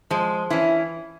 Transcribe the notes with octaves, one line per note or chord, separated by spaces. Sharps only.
F3 G#3
E3 C#4 E4